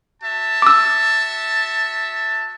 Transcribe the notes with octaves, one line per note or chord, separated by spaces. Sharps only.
F#4 E5 A5
D6 E6